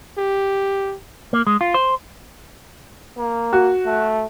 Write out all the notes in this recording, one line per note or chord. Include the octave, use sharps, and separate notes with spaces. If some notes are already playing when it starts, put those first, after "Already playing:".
G4
A#3
G#3
F4
C5
A#3
F#4
A3